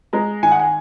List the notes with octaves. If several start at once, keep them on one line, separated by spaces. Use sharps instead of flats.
G#3 A#5
D#3 G#5
F#5
G#5